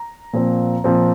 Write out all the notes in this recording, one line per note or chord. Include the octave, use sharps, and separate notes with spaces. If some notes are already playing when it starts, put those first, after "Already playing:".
Already playing: A#5
A#2 F3 C4
A#2 F3 C4